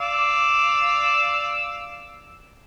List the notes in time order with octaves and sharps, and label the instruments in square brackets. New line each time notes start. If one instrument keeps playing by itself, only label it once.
[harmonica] D5 F5 E6